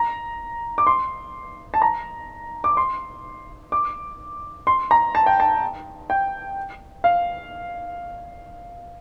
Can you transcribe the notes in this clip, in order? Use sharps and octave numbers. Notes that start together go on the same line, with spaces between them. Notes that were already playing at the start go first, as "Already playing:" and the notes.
Already playing: A#5
D6
C6
A5
A#5
D6
C6
D6
C6
A#5
A5
G5
A5
G5
F5